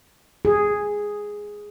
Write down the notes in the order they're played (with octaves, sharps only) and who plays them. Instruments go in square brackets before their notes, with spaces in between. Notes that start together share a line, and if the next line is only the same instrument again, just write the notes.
[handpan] G#4